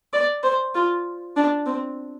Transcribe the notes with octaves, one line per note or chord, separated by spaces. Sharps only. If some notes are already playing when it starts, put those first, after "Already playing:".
D5
C5
F4
D4
C4